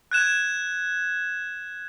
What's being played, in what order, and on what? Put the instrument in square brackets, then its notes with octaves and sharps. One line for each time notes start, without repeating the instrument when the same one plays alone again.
[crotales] F#6 G#6 E7